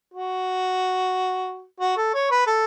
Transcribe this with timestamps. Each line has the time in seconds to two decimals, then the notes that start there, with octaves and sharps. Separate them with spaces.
0.14 F#4
1.80 F#4
1.96 A4
2.14 C#5
2.31 B4
2.46 A4